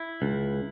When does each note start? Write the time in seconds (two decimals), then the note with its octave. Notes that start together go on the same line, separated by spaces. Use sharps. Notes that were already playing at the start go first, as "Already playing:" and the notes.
Already playing: E4
0.22 C#2